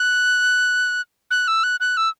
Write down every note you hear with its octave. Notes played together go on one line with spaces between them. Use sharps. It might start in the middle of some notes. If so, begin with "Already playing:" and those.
Already playing: F#6
F#6
E6
F#6
F#6
E6